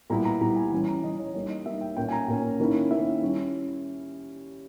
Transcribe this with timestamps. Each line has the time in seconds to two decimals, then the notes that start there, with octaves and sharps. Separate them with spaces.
0.10 A#2 G3 B3 E4 A#5
0.25 A#5
0.41 A#2 G3 B3 E4 A#5
0.56 G#5
0.72 E3 G3 C#4 G#5
0.88 A#5
1.04 E3 G3 C#4 D#5
1.19 C#5
1.34 G3 A#3 D#4 C#5
1.50 D#5
1.65 G3 A#3 D#4 E5
1.81 G5
1.97 A#2 A#3 C#4 G5
2.08 G#5
2.12 A#5
2.28 A#2 A#3 C#4 G#5
2.60 D#3 A#3 C#4 E4
2.91 D#3 A#3 C#4 E4 E5
3.22 G3 C#4 E4